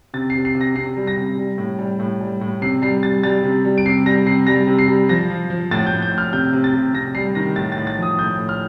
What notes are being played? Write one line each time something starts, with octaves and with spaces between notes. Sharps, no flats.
C3 A6
C3 C7
C7
C3
A#6
C3 C7
G3
A#6
C3
G3
A2
G3
A2
G3
A2
C3 C7
G3 C7
G3 A6
G3 A6
C3
G3
D7
C3 C7
G3 A#6
C3 C7
G3 A#6
C3
C7
G3
F3 A#6
F3
F3
A2 A6
G6
A2
G6
A2
F6
C3 G6
C3
A6
C3
C3 A#6
G3 C7
D#3 A#6
A2 A6
A2 A6
A6
F3
D#6
A2 G6
A2
F6